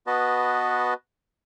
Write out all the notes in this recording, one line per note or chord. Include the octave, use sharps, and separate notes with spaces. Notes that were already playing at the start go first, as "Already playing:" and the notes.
B3 F#4 B4 D#5 A5